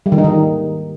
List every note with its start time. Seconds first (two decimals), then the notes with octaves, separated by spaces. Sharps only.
0.06 G3
0.12 D#3
0.18 D#4
0.24 D#3